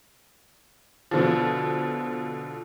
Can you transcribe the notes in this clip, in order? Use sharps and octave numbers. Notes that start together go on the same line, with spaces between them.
B2 D3 F3